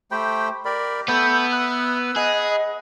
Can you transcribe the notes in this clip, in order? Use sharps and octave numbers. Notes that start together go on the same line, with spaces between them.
A3 G4 C5 G5 B5
G4 A#4 D5 B5
A3 B3 A4 B4 E6 G6
E5 B5 D#6 F#6
G#4 D#5 F#5 B5